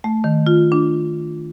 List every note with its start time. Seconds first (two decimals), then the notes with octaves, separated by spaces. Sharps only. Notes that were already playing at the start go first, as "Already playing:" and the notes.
0.04 A3
0.24 D#3
0.47 F4
0.72 D4